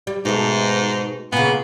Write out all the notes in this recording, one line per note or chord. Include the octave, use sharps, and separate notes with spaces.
G3
G#2 B2 A3
A#2 C#3 B3